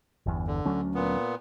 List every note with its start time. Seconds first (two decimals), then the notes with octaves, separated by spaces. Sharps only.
0.26 G1 E2
0.48 D3
0.66 D2 F#3 C#4
0.95 A#2 B3